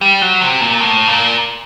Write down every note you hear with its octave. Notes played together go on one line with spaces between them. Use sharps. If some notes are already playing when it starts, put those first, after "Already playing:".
G3
F#3
C3
A#2
A2
A#2